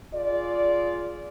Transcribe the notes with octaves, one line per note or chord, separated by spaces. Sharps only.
F4 G#4 D5